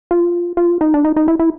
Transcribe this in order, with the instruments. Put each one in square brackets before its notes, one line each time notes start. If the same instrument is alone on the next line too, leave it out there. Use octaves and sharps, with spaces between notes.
[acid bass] F4
F4
D#4
D4
D#4
D#4
E4
E4